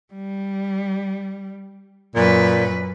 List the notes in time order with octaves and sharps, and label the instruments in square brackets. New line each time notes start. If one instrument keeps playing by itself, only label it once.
[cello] G3
[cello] F#2 B4 [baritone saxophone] A#2